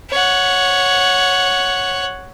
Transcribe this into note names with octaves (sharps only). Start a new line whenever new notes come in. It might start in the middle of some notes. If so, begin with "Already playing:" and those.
C#5 F#5